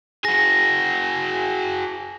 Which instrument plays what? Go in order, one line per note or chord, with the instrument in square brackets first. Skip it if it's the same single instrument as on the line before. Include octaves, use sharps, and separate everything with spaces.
[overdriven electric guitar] F#4 G#4 [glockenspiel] A#6